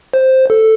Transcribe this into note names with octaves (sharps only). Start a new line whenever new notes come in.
C5
A4